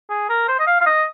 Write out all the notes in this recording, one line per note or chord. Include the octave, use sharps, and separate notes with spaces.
G#4
A#4
C5
D#5
F5
F5
D#5